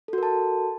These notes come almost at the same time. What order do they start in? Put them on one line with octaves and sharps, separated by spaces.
A4 F#4 A#4 A5